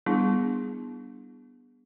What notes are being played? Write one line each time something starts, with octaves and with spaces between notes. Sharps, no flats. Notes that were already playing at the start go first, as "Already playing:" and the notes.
G3 B3 D4 E4 G#4